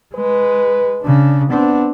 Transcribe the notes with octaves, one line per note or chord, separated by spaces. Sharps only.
G#3 B4
C#3 D4
B3 C4 D4